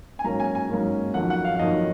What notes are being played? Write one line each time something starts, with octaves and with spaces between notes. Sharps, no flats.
G#5
G#2 F#3 A#3 C#4 A#5
G#5
G#5
G#2 F#3 A#3 C#4
F2 D#3 F#3 F#5
F#5
F5
F5
F2 D#3 F#3 D#5